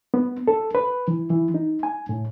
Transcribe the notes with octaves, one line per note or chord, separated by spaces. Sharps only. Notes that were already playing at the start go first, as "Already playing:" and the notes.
B3
A4
B4
E3
E3
D#4
G#5
A2